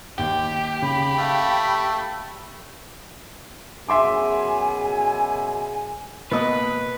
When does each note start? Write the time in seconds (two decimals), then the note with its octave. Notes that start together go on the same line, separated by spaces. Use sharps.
0.18 D#2 G4 G5
0.82 C#3 B5
1.19 A3 F5
3.89 F#2 B2 G#4 E5 G#5 C6 D6
6.31 B2 A#3 B4 D#5